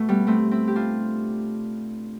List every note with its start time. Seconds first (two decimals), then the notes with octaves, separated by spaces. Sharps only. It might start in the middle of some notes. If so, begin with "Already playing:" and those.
Already playing: B2 A3
0.09 G3 B3
0.27 A3 C4
0.51 C4 E4
0.68 G4
0.76 D4 F4